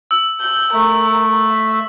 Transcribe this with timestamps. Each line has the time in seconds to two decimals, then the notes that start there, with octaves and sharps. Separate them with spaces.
0.11 E6
0.40 G6
0.74 A3 A#4
1.50 E5